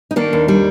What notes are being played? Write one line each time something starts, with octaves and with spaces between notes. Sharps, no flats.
D#4
D#3 A#3 D4
D#2
G3